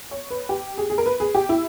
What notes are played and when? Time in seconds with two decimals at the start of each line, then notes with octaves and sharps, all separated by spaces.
0.11 C#5
0.30 B4
0.49 G4
0.78 G#4
0.90 G#4
0.98 A#4
1.06 B4
1.20 G#4
1.35 G4
1.49 E4